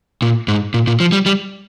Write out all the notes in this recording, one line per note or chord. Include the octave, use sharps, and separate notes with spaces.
A#2
G#2
A#2
A#2
F3
G3
G3